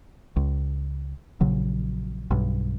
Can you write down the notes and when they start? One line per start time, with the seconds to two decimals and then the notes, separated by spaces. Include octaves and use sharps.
0.36 C#2
1.41 A#1 C#3 F#3
2.31 B1 G2